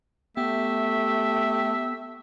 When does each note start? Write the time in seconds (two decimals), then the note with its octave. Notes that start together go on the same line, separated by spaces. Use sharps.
0.37 A3 B3 G4 E5